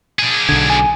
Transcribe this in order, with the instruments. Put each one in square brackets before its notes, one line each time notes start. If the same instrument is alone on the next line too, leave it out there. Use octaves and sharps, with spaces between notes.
[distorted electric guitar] D4 G#4
[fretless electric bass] B1 D3 [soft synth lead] G#6
[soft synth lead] G#5